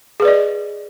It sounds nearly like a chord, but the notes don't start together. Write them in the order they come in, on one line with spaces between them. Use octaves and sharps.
G#4 B4 D5 D#5